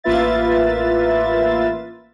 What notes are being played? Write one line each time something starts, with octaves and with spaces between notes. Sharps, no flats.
A1 A#3 F4 B4 E5 A6